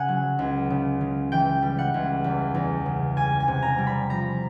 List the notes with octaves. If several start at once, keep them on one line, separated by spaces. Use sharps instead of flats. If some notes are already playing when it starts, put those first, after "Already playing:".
Already playing: C#3 F#5 G#5
F#3
C#2
C#3
C#3
E3 G5
G3
F#5
C#2
E2
E2
C#3
G3 G#5
G#5
C3
A#5
G3
B5
F3 A#5